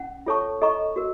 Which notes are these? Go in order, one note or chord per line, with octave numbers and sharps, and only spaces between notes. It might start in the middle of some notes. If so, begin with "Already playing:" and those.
Already playing: C#4 F#5
F4 A4 C#5 A5 C#6
A4 D#5 A#5 C#6
F#4 A#4